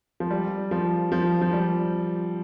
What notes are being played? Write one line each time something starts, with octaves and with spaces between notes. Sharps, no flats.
F3
G3
F3
F3
F3
G3